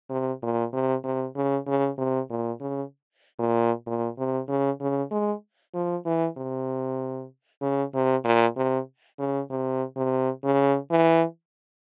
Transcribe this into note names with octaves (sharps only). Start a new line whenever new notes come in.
C3
A#2
C3
C3
C#3
C#3
C3
A#2
C#3
A#2
A#2
C3
C#3
C#3
G#3
F3
E3
C3
C#3
C3
A#2
C3
C#3
C3
C3
C#3
E3